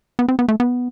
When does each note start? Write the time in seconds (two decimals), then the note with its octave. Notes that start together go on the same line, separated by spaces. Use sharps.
0.19 B3
0.28 C4
0.39 B3
0.48 A3
0.60 B3